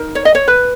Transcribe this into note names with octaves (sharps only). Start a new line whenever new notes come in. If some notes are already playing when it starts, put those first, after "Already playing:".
Already playing: D#4 A#4
C#5
D#5
C#5
B4